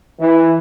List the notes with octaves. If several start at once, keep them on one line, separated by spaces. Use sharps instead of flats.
E3